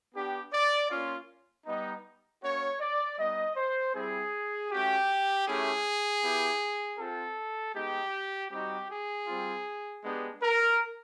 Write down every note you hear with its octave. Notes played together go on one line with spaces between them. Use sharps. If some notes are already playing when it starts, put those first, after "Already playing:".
B3 D4 G4
D5
A#3 C#4 F4
G3 B3 D#4
A#3 C#4 F#4 C#5
D5
G3 B3 D#4 D#5
C5
G3 C4 E4 G#4
A3 C#4 F#4 G4
A3 C#4 E4 G4 G#4
B3 E4 G4
C4 F4 A4
G#3 B3 D#4 G4
G3 C4 D#4 F#4 G4
G#4
G3 C4 F4
G#3 B3 D4 G4
A#4